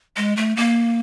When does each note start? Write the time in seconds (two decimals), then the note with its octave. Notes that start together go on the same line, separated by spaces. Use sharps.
0.17 G#3
0.37 A3
0.57 A#3